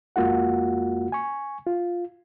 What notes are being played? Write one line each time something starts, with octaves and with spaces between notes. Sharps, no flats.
F2 G#3 A#3 F4 F#4 F#5
G#5 C#6
F4